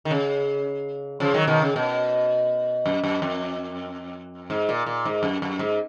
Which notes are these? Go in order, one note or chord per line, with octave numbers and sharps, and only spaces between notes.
D#3
C#3
C#3 F3
D#3 F#3
B2 D#3
C#3
B2
F#2
F#2
F2
G#2
A#2
A#2
G#2
F#2
F#2
G#2